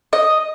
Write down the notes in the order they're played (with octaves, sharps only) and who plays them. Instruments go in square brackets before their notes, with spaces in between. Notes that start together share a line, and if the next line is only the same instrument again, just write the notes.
[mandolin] D#5